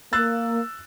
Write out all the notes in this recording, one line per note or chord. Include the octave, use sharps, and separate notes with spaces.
A#3 E6 F#6 A6